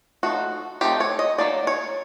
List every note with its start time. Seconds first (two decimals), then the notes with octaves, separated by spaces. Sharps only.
0.23 F3 A3 C4 D#4 F#4
0.81 F3 A3 C4 D#4 G4
1.00 C#5
1.19 D#5
1.38 F#3 A#3 D#4 D5
1.67 C#5